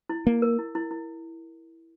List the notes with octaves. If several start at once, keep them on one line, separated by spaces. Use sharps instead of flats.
E4
A#3 E4
A#4
E4
E4
E4